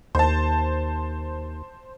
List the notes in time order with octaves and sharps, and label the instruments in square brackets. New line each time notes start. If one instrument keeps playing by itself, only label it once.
[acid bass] D#2 [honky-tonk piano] C5 A5